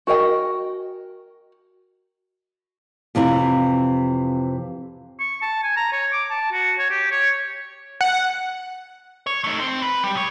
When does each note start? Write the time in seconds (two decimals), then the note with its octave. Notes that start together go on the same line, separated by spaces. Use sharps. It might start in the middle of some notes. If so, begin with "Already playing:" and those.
0.07 F#4 A#4 D#5 G5
3.15 F2 C3 E3 E4
5.20 C#6
5.42 A5
5.63 G#5
5.77 A#5
5.92 C#5
6.13 D6
6.30 A5
6.52 F#4
6.79 C#5
6.91 G4
7.11 C#5
8.01 F#5
9.27 C#5
9.44 A3 D#4
9.60 C4
9.82 B4
10.04 G3
10.15 B1 C#5